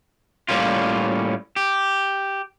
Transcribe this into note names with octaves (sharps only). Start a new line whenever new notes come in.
A2 G3 A#3 C#4 F4
G4